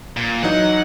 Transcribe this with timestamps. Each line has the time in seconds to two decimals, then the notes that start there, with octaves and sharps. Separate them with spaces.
0.17 A#2
0.43 E3 F#3 D#4 F#5